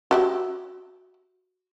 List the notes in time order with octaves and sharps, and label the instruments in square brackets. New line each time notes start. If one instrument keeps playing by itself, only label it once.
[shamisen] F#4 G4 E5